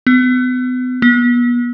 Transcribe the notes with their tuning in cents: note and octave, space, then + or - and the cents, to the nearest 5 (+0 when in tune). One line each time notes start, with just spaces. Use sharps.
B3 +35
B3 -35